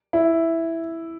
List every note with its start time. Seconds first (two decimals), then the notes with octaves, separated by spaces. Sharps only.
0.13 E4